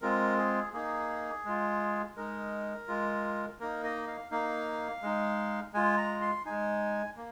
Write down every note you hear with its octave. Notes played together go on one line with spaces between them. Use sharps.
G#3 C4 F4 A#4
G#4
A#3 D#4 G#4
G#3 F4
G#3 D#4 A#4
G#3 F4
A#3 D#4 A#4
D#5
F5
A#3 D#4 F5
G#3 D#4
G#3 F4 G#5
A#5
C6
G#3 D#4 G#5
A#3